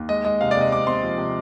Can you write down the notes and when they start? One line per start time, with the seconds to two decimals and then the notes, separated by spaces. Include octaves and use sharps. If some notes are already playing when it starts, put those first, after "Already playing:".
Already playing: D#2
0.09 G#3 D#5
0.25 G#3 D#5
0.41 C3 F5
0.51 D5
0.57 C3 D#5
0.72 C4 D6
0.87 C4 C6
1.04 F3
1.18 C3